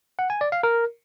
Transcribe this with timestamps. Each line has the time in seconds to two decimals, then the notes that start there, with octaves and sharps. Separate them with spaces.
0.19 F#5
0.30 G#5
0.41 D5
0.52 F5
0.63 A#4